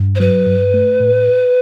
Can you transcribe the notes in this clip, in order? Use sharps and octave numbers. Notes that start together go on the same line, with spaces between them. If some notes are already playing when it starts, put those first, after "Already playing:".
Already playing: G2
C5
F#3 B4
G2
A3
A2